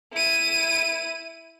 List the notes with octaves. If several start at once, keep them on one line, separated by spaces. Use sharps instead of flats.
E4 D#7